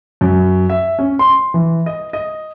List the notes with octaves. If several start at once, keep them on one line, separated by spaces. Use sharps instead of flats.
F#2
E5
C#4
C6
E3
D#5
D#5